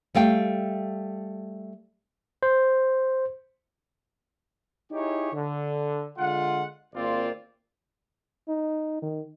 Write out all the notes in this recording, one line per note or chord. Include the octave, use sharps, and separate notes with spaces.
G3 A3 F5 G5
C5
D#4 E4 G4 G#4 C#5
D3
D3 G#3 F4 F#5
G#1 A#3 C4 F4 D5
D#4
D#3